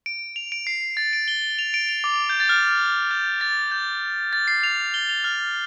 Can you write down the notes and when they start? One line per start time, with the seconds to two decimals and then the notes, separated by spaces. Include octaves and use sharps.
0.06 D7
0.36 F7
0.52 D7
0.67 C7
0.97 A6
1.13 D7
1.28 G7
1.59 F7
1.74 D7
1.89 F7
2.04 D6
2.29 G6
2.40 A6
2.49 F6
3.11 G6
3.41 A6
3.71 G6
4.33 A6
4.48 C7
4.63 F7
4.94 G7
5.09 F7
5.24 F6